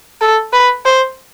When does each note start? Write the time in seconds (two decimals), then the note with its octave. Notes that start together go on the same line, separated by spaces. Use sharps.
0.21 A4
0.53 B4
0.85 C5